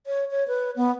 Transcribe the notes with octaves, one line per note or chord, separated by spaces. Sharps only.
C#5
C#5
B4
B3